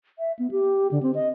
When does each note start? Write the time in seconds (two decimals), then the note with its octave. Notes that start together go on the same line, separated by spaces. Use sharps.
0.19 E5
0.39 B3
0.51 G4
0.91 D3
1.03 C4
1.15 D#5